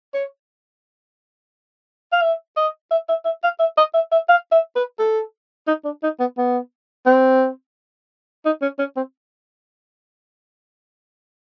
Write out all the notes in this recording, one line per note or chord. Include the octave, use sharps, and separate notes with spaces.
C#5
F5
E5
D#5
E5
E5
E5
F5
E5
D#5
E5
E5
F5
E5
B4
A4
D#4
D4
D#4
B3
B3
C4
D#4
C#4
C#4
C4